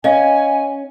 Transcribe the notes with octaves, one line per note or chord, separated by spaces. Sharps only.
C#4 D#5 F5 G#5